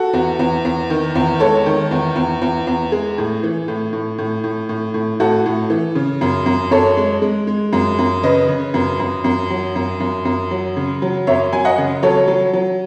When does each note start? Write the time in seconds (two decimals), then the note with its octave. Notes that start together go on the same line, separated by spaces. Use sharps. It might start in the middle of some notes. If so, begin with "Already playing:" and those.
Already playing: F#4 A4
0.13 E2
0.39 E2
0.65 E2
0.90 D#3
1.15 E2
1.40 G#3 A4 C#5
1.66 D#3
1.91 E2
2.16 E2
2.42 E2
2.67 E2
2.92 G#3 G#4
3.18 A2
3.43 E3
3.68 A2
3.93 A2
4.18 A2
4.44 A2
4.69 A2
4.94 A2
5.20 A2 F#4 A4
5.46 A2
5.70 E3
5.95 C#3
6.21 F#2
6.46 F#2
6.71 F#2 A4 C#5
6.97 G#3
7.22 G#3
7.47 G#3
7.73 F#2
7.99 F#2
8.23 C#3 B4 D#5
8.48 C#3
8.74 F#2
9.00 F#2
9.24 F#2
9.50 F#3
9.76 F#2
10.00 F#2
10.25 F#2
10.51 F#3
10.76 C#3
11.02 F#3
11.27 F#2 C#5 E5
11.52 F#3 G#5
11.65 D#5 F#5
11.78 C#3
12.03 F#3 A4 C#5
12.28 F#3
12.53 F#3